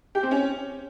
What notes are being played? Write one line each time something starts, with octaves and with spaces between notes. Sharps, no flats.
G4
C4
C#4